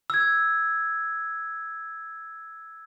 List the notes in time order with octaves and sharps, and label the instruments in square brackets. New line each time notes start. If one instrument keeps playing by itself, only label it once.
[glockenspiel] E6 G#6